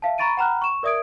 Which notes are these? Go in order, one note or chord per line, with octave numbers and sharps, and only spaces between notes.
E5 F5 A5
A#5 B5 C#6 A6 D7 D#7
F#5 G5 A#5 B5 F6 F#6
C#6 E7
A#4 D5 E5 D#6 G#6 D7